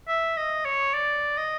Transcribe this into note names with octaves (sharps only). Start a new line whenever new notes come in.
E5
D#5
C#5
D5
D#5